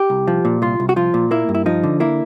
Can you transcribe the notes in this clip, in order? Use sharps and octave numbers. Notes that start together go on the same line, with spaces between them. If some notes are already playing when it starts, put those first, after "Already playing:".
Already playing: G4
C2
F3
A#2
C2 F4
C2
F#4
F3 F4
A#2
A#3 E4
G2
E4
F3 D#4
D3
A#3 E4